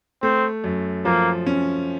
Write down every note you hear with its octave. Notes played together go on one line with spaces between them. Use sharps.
A3 C4
F#2
F3 A#3
C#4